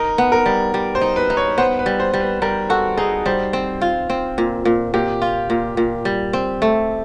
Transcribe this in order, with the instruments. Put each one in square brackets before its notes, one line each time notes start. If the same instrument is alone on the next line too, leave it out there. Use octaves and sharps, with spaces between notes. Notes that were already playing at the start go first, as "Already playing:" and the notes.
Already playing: [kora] D#4 [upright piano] A#4
[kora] B3
[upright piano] A#4
[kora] G3
G3
[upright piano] C5
[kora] D#4
[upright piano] B4
[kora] D#4
[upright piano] C#5
[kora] B3 [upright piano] C5
[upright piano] B4
[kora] G3
[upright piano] C5
[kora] G3
[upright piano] B4
[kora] G3 [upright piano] A#4
[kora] F#4 [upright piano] A4
[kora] D#4 [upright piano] G#4
[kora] G3 [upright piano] C5
[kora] C4
F4
C4
A#2
A#2
[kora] A#2 [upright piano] G4
[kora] F4
A#2
A#2
G3
C4
A3